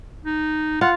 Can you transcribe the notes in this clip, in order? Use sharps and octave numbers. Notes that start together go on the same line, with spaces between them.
D#4
F4 F#5